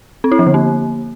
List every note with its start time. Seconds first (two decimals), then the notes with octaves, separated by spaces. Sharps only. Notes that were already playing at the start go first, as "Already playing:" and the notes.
0.24 C4
0.32 E4
0.39 F3
0.47 D3
0.54 A#3